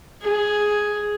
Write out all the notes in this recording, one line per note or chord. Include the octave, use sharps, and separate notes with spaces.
G#4